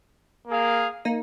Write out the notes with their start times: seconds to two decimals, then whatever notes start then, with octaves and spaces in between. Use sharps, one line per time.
0.47 A#3 G#4 F5
1.05 A#3 D#4